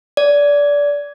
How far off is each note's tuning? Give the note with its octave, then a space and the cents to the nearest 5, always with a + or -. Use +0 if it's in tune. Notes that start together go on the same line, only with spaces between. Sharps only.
D5 -20